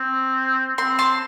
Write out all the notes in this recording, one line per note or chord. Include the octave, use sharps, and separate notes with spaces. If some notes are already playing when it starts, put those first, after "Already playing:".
Already playing: C4
C4 C6
A5 C6